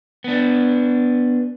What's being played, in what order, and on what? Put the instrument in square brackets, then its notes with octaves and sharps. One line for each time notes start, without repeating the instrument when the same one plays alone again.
[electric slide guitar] B3 D4